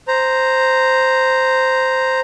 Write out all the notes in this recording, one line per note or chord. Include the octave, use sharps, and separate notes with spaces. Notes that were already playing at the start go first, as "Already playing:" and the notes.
C5 A#5